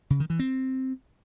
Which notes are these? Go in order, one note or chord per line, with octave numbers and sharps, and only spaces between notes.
C#3
D#3
E3
C4